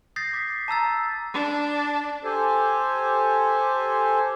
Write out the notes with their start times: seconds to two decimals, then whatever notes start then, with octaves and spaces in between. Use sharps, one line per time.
0.16 D#6 G6 A6 A#6 C7
0.33 D6 B6
0.68 A5 A#5 E6 A6
1.34 D4
2.24 G4 A4 C5 G#5